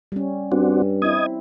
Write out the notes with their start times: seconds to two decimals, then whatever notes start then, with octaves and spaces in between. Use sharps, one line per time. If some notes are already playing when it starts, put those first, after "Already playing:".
0.12 G3 C#4
0.52 G2 C4 D4 F#4
1.02 C4 E4 D#5 D#6 G#6